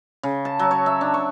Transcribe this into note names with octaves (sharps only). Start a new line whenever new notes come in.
C#3
A5
F#3
C#5
E5
D4
C#6